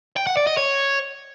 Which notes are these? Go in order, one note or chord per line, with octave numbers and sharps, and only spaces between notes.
G5
F#5
D5
D#5
C#5